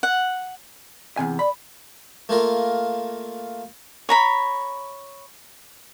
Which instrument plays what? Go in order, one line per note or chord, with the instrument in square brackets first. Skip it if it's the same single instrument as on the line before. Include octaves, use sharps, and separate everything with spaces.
[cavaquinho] F#5
[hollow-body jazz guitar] E2 C3 G#5
[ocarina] D5 [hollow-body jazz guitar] B5
[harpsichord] A3 A#3 F4 A#4
[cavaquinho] C#5 A#5 B5